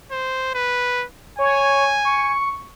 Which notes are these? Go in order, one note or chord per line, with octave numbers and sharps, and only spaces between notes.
C5
B4
C#5 G#5
C#6